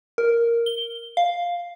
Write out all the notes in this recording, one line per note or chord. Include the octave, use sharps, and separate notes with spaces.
A#4
G7
F5